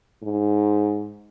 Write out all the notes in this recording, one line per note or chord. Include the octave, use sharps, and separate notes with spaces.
G#2